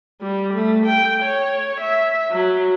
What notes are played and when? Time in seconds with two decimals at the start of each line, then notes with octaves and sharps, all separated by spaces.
0.21 G3
0.54 A3
0.86 G5
1.23 C#5
1.80 E5
2.32 F#3